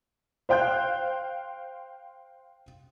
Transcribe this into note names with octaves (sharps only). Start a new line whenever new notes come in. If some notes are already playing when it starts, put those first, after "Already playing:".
C5 F5 G5 F#6 G6